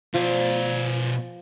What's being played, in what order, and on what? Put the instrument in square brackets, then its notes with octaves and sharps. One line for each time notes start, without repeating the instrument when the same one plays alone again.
[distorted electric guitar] B2 D5 [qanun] F3